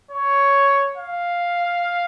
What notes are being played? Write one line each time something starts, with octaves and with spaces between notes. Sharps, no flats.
C#5
F5